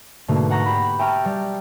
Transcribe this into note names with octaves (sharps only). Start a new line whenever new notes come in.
G#2 B2 D3 A3 A#3
F#5 A#5 C#6
G4 B5
E5 G5 A5 A#5 C#6 F6
G3